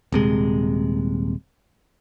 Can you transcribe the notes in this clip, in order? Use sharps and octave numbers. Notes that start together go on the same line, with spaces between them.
D#1 C3 G#3